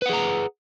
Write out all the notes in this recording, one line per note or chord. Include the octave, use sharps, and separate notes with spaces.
G#4 B4 F#5 A#5